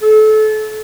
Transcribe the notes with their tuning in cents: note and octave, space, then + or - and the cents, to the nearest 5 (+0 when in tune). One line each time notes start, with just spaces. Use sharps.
A4 -25